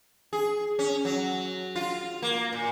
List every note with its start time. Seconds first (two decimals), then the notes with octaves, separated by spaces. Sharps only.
0.33 G#4
0.79 C#4
1.05 F#3
1.76 F4
2.22 A#3
2.53 A#2